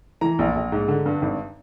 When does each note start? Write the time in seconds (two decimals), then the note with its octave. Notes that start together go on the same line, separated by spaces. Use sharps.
0.21 E3 A#5
0.39 A#1
0.56 A#1
0.72 G#2
0.88 D3
1.06 G2
1.22 G#1